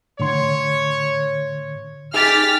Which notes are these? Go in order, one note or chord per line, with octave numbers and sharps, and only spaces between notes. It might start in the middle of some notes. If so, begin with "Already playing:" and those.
A2 D3 C#5 C6
D#4 G4 G#4 G#5 F6 A6 B6